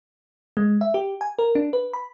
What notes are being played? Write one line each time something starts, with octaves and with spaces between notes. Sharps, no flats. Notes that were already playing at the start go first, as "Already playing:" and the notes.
G#3
E5
G4
G#5
A#4
D4
B4
B5